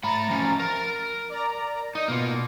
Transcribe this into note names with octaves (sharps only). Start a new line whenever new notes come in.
A3 A#5 B5 A6
F3 C#4
A#4
D5 A#5
D#4
B2 A#3 F4